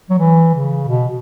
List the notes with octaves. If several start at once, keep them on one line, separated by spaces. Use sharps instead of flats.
F#3
E3
C#3
B2